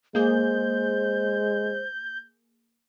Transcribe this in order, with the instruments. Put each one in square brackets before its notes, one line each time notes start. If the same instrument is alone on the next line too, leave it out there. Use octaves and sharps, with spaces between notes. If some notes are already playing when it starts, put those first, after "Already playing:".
[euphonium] G#3 [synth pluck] A#3 G#4 [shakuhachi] C5 [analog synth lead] G6